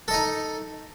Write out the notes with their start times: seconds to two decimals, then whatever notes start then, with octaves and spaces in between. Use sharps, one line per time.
0.08 A4
0.11 D#5
0.14 D#4